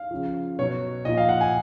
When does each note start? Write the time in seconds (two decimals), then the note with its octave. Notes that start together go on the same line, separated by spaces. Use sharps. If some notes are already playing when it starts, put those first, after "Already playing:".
Already playing: F5
0.11 C#3 F3
0.59 B2 F#3 C#5
1.05 A#2 F3 D#5
1.17 F5
1.29 F#5
1.41 G#5